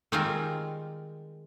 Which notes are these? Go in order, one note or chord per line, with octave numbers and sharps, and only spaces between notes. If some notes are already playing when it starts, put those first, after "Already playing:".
D#3 G3 G#3 C4 F4 A#4